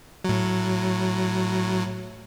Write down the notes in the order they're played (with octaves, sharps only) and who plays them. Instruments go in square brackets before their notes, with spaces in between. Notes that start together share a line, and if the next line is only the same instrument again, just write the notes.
[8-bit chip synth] A2 F#3